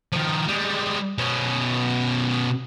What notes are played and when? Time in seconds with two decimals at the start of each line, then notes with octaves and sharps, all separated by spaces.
0.13 D#3 F3
0.48 G3 G#3
1.18 B2 C#4